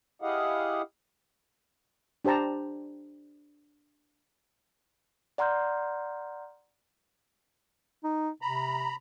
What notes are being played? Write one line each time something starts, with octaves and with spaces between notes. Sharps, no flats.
E4 G4 G#4 D#5 F5 F#5
D4 G4 C5 A5 A#5
D5 F#5 A#5 C6 F6 G6
D#4
C3 A#5 B5